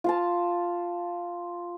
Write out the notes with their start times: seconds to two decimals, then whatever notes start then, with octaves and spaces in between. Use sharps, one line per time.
0.04 F4 F5 A5